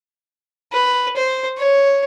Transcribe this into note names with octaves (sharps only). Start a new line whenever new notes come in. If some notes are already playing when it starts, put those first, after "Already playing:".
B4
C5
C#5